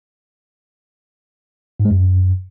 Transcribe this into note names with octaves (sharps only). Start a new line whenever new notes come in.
G#2
G#3
F#2